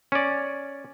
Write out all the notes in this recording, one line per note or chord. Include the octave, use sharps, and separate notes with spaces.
C#4 D5